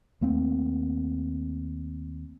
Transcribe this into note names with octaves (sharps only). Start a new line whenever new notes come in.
D#2 A3 A#3 C4